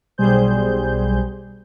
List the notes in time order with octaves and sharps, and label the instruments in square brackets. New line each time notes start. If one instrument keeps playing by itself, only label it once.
[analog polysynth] B1 G3 G#4 C5 G6